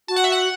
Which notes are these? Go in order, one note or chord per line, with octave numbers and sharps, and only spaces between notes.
F#4 A5
F#5
E5
F#5